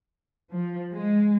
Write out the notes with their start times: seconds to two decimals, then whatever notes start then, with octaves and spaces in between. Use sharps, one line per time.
0.53 F3
0.90 G#3